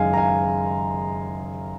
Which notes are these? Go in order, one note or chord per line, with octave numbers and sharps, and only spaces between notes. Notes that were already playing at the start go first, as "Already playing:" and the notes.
Already playing: F#1 F#2 D#3 G#3 D#5 F5 G#5
A#5
F5 G#5